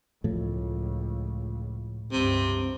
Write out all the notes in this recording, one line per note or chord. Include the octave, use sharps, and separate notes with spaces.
C#2 A2 F3
C#2 G2 C3